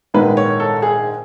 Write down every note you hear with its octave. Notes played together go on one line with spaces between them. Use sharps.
A#1 G#2 D#3 G#3 B4
C#5
A4
G#4